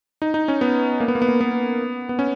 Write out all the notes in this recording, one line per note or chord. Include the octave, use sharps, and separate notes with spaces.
D#4
D#4
C#4
B3
A#3
B3
A#3
B3
A#3
B3
B3
C#4